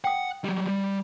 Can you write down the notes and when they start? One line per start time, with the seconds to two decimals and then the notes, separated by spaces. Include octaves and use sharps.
0.04 F#5 G5 D#6
0.44 F#3 G3
0.68 G3